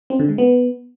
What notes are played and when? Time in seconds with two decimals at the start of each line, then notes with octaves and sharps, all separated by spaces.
0.10 C4
0.20 D3
0.29 G#3
0.38 B3